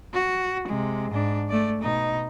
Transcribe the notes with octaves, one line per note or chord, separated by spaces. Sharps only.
F#4
C3 G#3
G#2 D4
A3 D5
B2 D#4